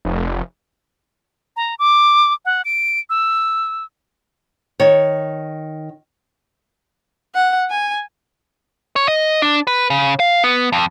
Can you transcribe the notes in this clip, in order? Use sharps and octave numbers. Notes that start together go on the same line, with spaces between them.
F1
A#5
D6
F#5
D7
E6
D#3 C#5
F#5
G#5
C#5
D#5
D4
B4
C#3
F5
B3
F2